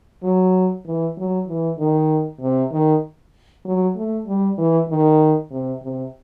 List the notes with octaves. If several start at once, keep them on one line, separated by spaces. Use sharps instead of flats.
F#3
E3
F#3
E3
D#3
C3
D#3
F#3
A3
G3
E3
D#3
C3
C3